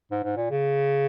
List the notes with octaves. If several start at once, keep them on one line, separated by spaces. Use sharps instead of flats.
G#2
G#2
A#2
C#3